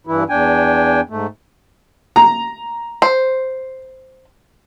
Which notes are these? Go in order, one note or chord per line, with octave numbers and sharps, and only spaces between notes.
G2 E3 E4
E2 D4 G5 G#5
G#2 A3
A#5
C5